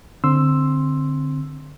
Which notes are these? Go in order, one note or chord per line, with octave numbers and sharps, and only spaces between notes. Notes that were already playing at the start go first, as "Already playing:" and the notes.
D3 C4 C6 E6